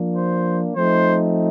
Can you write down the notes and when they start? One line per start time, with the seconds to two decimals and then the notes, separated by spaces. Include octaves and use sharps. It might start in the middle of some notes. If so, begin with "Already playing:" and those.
Already playing: F3 A#3 D4
0.15 C5
0.75 F3 A3 C4 D#4 C5